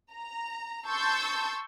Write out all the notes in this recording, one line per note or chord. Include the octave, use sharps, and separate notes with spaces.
A#5
A5 C6 C#6 E6 G6 A6